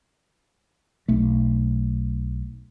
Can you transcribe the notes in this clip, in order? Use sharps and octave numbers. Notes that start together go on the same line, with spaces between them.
B1 A3